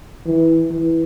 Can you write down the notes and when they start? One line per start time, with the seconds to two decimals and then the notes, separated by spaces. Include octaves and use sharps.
0.26 E3
0.71 E3